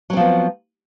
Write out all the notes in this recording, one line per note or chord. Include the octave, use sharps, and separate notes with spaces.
F3 F#3 B3 C4